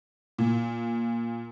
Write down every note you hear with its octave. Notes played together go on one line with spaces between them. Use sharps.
A#2